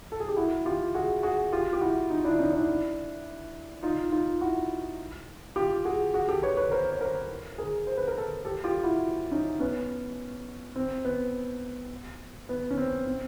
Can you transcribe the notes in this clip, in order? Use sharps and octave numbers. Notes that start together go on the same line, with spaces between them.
A4
G#4
G4
E4 F#4
F4 G4
F#4 G#4
F#4 G#4
F4 G4
G4
E4 F#4
D#4 F4
D4 E4
C#4 D#4
D4 E4
D#4 F4
D#4 F4
E4 F#4
F4 G4
F#4 G#4
F#4 G#4
G4 A4
B4 C#5
B4 C#5
A#4 C5
C#5
A#4 C5
G#4 A#4
C5
B4
A#4
A4 B4
G4 A4
F4 G4
E4 F#4
C#4 D#4
B3 C#4
C4
B3
B3
C#4
C4
C4